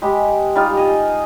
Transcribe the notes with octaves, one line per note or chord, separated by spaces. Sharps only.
G#3 G4 B5
G3 D#4 F4
D#5 G#5